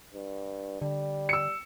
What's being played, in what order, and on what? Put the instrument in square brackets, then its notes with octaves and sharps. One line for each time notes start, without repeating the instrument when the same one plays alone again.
[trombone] G2
[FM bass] D3 [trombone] G3
[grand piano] E6 C#7